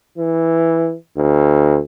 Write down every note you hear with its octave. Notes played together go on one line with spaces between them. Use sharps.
E3
D2